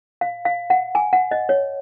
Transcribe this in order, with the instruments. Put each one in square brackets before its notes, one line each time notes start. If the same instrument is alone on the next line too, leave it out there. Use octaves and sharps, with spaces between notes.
[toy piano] F5
F5
F#5
G#5
F#5
D#5
C#5